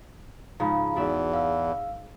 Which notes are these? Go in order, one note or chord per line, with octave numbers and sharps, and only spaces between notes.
G#2 C#3 F3 A#5 B5
E2 G#2 F#4 D5 E5
F5 E6